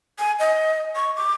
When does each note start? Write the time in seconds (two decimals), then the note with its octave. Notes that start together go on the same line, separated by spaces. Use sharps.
0.19 G#5
0.40 D#5
0.96 C#6
1.16 D6